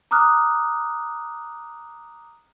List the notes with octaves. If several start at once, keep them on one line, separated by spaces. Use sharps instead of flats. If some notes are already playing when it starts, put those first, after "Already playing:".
A#5 D6 D#6 F6 F#6